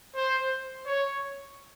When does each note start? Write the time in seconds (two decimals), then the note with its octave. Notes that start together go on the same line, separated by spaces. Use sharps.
0.16 C5
0.86 C#5